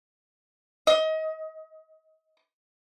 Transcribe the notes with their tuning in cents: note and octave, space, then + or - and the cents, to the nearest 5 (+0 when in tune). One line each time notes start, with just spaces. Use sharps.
D#5 +30